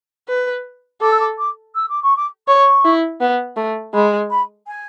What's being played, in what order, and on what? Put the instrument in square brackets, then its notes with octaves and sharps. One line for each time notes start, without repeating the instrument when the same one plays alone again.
[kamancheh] B4
[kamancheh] A4 [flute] D6
[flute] E6
D6
D6
E6
D6
C#6
D6
[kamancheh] C#5 [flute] C#6
[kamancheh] E4
B3
A3
[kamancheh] G#3 [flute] B5
[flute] B5
G#5